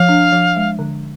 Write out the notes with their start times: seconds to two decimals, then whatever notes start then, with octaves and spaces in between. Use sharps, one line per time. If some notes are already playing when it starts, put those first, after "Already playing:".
Already playing: F3 F5
0.09 D4
0.32 F3
0.57 G#3
0.79 D3